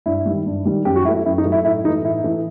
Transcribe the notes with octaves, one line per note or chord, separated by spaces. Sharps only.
G2 E4
D#3 G3
G2
D#3 G3
F#2 G4
F#4
F#3 A3 E4
E4
F#2 E4
D#4
F#3 A3
E4
A2 E4
E3 A3 D#4
A2 E4
E3 A3